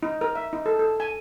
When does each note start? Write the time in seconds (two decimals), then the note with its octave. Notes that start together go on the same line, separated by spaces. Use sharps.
0.03 D#4
0.21 A#4
0.35 E5
0.53 D#4
0.66 A4
0.79 A4
1.00 G#5